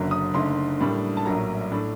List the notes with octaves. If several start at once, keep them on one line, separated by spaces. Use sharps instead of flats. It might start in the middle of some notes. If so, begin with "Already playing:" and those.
Already playing: F#1 F#2 D3 F#3 A#3
D#6
F#1 F#2 D3 A3 D#4 C6
A2 G3 A#3 D4
A5
A#1 A2 F#3 A#3 A#5
A2 A3 D4